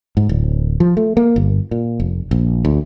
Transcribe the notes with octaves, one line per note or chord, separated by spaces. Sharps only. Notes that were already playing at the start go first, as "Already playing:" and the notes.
G#2
D1
F3
A3
A#3
G1
A#2
F1
A#1
D2